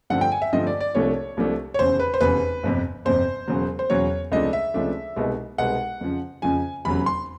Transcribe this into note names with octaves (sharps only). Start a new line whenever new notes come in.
G2 D3 F3 A3 C4 F#5
G5
G#5
E5
G2 D3 F3 A3 C4 D#5
D5
D5
C2 C3 F3 A3 D4 C#5
C2 C3 F3 A3 D4
C#5
F1 E2 C#3 C5
B4
C5
F1 E2 C#3 B4
G1 F2 C3
G1 F2 C3 C5
E1 E2 C#3 F#3
C5
E1 E2 C#3 F#3 C#5
C#2 C3 F3 A3 D4 D#5
E5
C#2 C3 F3 A3 D4
C2 B2 G#3 B3 D#4
C2 B2 G#3 B3 D#4 F#5
F2 C#3 F3
F2 C#3 F3 G#5
F1 E2 C#3 F#3 B5
C6